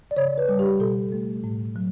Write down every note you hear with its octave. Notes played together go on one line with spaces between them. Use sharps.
D5
C#3 C#5
B4
G3
G4
B2 A4
A3
A2
F#3